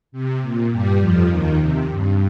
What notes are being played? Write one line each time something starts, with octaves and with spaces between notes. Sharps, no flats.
C3
A#2
G2 G3
F2 F3
D#2 D#3
C3
G2